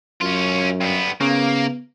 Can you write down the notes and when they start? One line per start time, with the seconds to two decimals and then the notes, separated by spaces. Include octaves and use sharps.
0.21 F#2 C#4 F4
0.81 G2 B3
1.21 C#3 A#3 B3